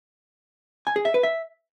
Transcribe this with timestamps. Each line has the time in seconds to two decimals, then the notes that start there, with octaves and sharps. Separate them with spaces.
0.87 G#5
0.96 G#4
1.05 E5
1.14 B4
1.23 E5